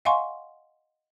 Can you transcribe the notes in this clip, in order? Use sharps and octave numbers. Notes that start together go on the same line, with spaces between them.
D#5 F5 F#5 G#5 C6 C#6